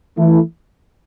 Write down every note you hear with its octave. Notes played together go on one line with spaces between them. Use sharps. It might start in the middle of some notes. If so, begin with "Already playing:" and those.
E3 A3 E4